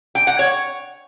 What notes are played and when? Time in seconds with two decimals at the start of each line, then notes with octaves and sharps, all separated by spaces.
0.15 G5
0.27 F#5
0.39 C#5